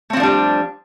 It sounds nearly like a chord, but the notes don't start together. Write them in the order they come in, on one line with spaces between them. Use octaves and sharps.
A3 C4 F3 D4 G3